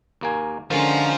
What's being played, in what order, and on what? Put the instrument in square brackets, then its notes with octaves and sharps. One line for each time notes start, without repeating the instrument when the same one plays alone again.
[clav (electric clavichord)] D#2 A#3 G#5
[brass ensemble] D3 [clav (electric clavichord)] D#3 G#3 [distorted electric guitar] F3 F4 [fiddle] C#4 A#5